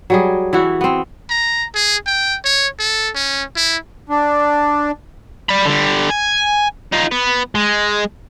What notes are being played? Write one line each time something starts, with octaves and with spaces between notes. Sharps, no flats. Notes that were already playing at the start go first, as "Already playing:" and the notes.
F#3 G3 G#4
E3 E4 F#4
B3 C4
A#5
G#4
G5
C#5
A4
C#4
E4
D4
D5 B5
D3 G3
G#5
D#4 F4
B3
G#3